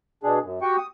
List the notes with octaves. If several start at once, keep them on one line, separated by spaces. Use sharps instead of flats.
B2 D4 G#4
F#2
F#4 G4 G5 C#6
D#6